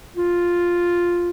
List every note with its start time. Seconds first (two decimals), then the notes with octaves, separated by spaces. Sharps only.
0.16 F4